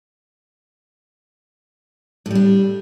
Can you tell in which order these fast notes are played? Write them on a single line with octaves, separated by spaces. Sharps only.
A2 G3 D4